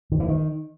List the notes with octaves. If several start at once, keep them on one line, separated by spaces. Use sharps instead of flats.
D#3
E3
D#3